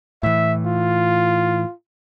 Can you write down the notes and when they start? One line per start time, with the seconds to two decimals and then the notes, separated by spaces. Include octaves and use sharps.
0.23 A2 E3 E5
0.66 F4